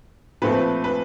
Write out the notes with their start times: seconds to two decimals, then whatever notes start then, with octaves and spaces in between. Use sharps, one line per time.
0.42 A#2 F3 A3 C4 B4
0.84 B4